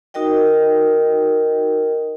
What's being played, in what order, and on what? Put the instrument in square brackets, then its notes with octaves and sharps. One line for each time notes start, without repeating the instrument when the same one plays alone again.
[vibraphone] D#4 F#4 A#4 D#5 G5